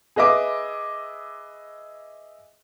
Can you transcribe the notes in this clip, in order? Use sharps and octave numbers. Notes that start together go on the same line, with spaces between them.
G#4 B4 D#5 E5 D6